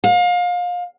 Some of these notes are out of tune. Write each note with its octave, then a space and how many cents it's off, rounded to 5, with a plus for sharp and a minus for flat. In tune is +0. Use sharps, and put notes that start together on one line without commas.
F5 +30